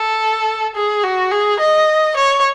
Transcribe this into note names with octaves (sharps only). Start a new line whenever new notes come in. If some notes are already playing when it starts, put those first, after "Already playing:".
Already playing: A4
G#4
F#4
G#4
D#5
C#5